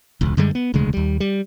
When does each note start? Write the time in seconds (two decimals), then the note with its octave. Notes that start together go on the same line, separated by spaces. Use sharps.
0.21 E1 C#2
0.37 F#2 D3 G3 G#3
0.55 B3
0.74 E1 D2 C#3 G#3
0.94 D#2 G3
1.20 G3